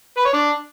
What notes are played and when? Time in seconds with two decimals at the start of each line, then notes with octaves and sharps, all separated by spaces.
0.17 B4
0.25 C#5
0.33 D4